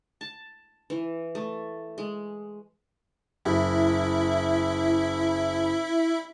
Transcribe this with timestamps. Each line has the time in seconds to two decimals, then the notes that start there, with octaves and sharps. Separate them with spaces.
0.21 A5
0.90 E3
1.35 A3
1.98 G#3
3.45 F#1 E4 E5